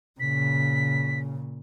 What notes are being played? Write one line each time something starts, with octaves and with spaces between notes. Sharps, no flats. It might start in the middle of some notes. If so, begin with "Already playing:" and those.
A#2 C#3 B6